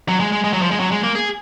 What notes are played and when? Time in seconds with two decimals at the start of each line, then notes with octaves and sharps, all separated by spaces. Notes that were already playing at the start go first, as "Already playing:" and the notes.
0.08 F#3
0.20 G#3
0.32 G#3
0.44 G#3
0.53 F#3
0.62 F3
0.71 G#3
0.80 F#3
0.92 G#3
1.03 A#3
1.15 G#4